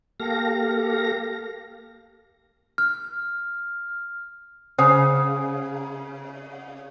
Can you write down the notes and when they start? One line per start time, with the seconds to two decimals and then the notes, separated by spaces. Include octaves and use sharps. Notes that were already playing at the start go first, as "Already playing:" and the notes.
0.20 A#3 G4 A4 F5 A#6
2.78 F6
4.78 C#3 C5 F#5 D#6